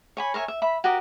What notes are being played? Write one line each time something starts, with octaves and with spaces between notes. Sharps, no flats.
C#5 G#5 B5
A#4 C#5 E5 G#5
E5
E5 B5
F#4 G4 A#4 D#5